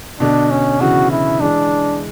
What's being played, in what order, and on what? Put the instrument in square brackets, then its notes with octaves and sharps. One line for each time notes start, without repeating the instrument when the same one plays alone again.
[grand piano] B2 D3 [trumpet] D4
[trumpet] C#4
[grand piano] C#3 E3 [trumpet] F#4
[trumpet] E4
[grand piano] E3 G#3 [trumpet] D4